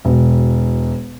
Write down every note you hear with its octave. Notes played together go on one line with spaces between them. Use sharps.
E1